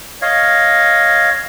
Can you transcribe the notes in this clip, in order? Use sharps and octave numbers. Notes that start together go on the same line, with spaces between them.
C#5 D#5 F5